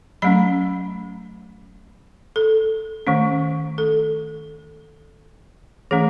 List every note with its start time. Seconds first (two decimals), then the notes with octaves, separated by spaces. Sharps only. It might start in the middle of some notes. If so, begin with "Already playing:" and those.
0.22 F#3 A3 C#4 B5
2.36 A4
3.07 D#3 A3 C#4
3.78 A4
5.91 E3 A3 C#4 G#4